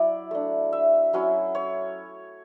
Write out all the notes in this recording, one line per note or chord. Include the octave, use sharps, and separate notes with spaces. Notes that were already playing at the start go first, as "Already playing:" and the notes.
Already playing: F#3 E4 D5 E5
A3 D4
E5
F#3 C#4 E4
C#5